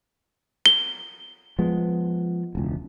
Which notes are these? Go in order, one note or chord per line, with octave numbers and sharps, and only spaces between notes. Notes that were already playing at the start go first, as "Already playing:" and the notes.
G7
F3 G#3 B3
E1 C#2